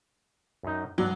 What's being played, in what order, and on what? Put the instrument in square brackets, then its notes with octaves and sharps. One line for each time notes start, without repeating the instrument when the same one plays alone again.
[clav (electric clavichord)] F#2 D#4
[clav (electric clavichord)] G2 D5 F#5 [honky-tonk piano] F#3